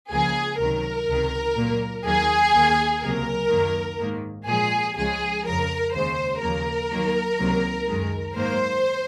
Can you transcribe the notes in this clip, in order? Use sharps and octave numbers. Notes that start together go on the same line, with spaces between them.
C#2 C#3 F3 A#3 G#4
C#2 C3 D#3 F#3 A#4
C#2 C3 D#3
A#2 F#3 A#3
D#2 D#3 F#3 A#3 G#4
D#2 D#3 A#3
C#2 C3 F#3 A#3 A#4
F#2 D#3 F#3 A#3
G#2 D#3 A#3
A#2 F3 G#3 G#4
C#2 C#3 F3 G#3 G#4
F2 C#3 F3 A#4
D#2 C#3 G#3 C5
D#2 C#3 F3 A#3 A#4
D#2 D#3 F#3 A#3
C#2 C3 D#3 F#3 A#3
F#2 D#3 G#3
G#2 D#3 F#3 A#3 C5